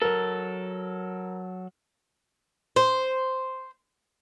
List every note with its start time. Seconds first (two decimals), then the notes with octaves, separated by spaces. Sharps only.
0.02 F#3 A4 A#4
2.76 C5